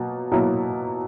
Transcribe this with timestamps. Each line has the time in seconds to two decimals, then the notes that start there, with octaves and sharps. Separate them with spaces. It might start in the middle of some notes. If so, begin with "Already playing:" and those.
Already playing: B2 F#3 A#3
0.31 B2 F#3 A#3 E4